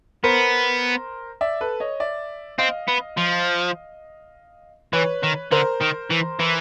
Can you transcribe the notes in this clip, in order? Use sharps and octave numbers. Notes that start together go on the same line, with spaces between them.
B3 A#4 C5
D5 E5
A4 B4
C#5 D#5
D5 E5
C4 D#5 F5
B3
F3
E3 B4 C#5
D#3
D3 A#4 C5
D#3
E3
E3